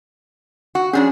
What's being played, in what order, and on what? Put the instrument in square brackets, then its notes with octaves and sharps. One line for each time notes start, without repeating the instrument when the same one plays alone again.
[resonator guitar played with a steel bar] F#4
[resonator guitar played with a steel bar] F2 D4 G#4 [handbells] C#4